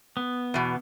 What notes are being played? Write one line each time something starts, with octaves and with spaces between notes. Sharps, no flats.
B3
E2 B2